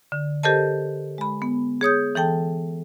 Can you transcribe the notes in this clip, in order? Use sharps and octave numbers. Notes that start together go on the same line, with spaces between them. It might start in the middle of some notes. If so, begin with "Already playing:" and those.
D3
G4 A4 A#4 C5 D#5 A5
G#3 B5
B3
G#4 C#5 D#6 G6
E3 A4 G5 A5